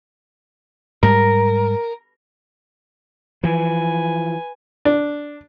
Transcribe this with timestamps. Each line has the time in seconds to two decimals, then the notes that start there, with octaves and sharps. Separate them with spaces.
1.03 G#2 G3 G#3 A#4
3.44 E3 F3 B4 G#5
4.85 D4